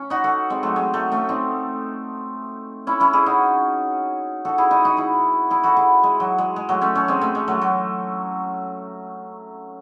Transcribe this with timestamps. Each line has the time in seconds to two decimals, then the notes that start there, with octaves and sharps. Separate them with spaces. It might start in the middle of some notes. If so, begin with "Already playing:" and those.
Already playing: C#4
0.10 D#4 F#4
0.24 F#4 A4
0.50 G#3 C4
0.63 F#3 A3
0.76 G#3
0.94 F#3 A3
1.12 A3 C#4
1.29 C4 D#4
2.87 C#4 E4
3.00 C#4 E4
3.13 E4 G#4
3.26 D#4 F#4
4.45 F#4 A4
4.58 E4 G#4
4.71 D#4 F#4
4.85 D#4 F#4
4.97 E4 G#4
5.50 E4 G#4
5.64 F#4 A4
5.77 E4 G#4
6.03 G#3
6.20 F#3
6.38 G#3
6.56 G#3
6.69 F#3 A3
6.81 A3 C#4
6.95 A3 C#4
7.08 G#3 C4
7.21 A3 C#4
7.35 G#3
7.48 F#3 A3
7.62 F#3